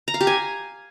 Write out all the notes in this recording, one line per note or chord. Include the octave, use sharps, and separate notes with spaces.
A#5
F5
G4
G#5